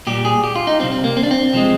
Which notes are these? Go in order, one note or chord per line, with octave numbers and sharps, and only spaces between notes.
A#2 G3 G4
G#4
G4
F4
D#4
C3 G3 C4
C4
A#3
C4
D4
C4
C3 F3 G#3